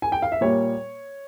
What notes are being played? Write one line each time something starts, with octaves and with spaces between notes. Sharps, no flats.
G#5
G5
F5
E5
A#2 G3 A#3 C#5